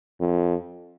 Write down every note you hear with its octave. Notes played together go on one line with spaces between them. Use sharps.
F2